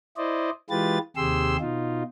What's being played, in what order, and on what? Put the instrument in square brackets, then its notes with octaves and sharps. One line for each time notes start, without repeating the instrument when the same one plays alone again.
[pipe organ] E4 C5 D5 D#5
E3 G#3 F4 G4 B4 A6
D#2 C3 G4 G#4 C6 E6
B2 D#4 F4